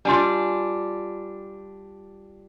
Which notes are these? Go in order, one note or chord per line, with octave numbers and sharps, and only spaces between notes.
G3 D4 F4 G#5